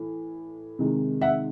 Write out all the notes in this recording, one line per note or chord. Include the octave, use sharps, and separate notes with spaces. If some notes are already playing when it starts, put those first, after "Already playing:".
Already playing: A2 E3
C3 D#3 G#3
E5 F#5